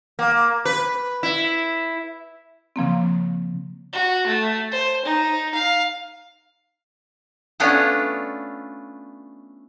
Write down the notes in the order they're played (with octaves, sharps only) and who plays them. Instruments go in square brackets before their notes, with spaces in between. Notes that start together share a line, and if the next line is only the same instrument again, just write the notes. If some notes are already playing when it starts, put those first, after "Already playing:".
[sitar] A#3
B4
E4
[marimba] C#3 F3 A#3 C4
[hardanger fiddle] F#4
A3
C5
D#4
F5
[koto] A3 B3 C#4 D4 F4